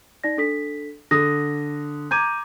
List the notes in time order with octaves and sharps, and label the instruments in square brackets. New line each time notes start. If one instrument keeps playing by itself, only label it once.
[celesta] D#4 D5 A#6
D4 A4 B6
[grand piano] D3 D#6 [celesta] A#6
[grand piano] A#5 D6 G#6 [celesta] G6 D#7